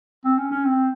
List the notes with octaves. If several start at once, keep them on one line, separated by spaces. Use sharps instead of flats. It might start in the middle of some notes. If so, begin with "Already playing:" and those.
C4
C#4
C#4
C4